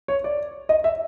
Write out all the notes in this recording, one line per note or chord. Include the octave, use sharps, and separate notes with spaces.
C#5
D5
D#5
E5